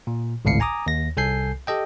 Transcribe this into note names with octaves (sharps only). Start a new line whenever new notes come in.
A#2
G#1 C#2 A2 F5 C7 C#7
G#5 A#5 D6 D#6
D#2 A#6
C2 A4 G#5 G6 C7
G4 A4 D#5 G5